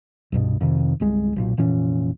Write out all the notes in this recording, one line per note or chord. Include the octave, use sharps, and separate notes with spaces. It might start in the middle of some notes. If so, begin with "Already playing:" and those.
C2 G2 B2
F2 C3 D#3
G1 C2 G#3
B1 A#2
F1 A#2 E3 C#4